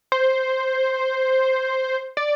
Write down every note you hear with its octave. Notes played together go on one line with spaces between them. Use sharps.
C5
D5